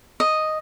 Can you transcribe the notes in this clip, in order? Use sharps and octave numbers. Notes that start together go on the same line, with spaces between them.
D#5